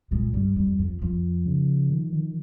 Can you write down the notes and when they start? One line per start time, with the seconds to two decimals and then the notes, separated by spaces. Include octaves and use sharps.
0.11 A#2 G#3
0.33 G2 G3
0.56 F2 G3
0.79 F2 F3
1.02 F2 F3
1.46 C#3
1.90 D#3
2.13 D#3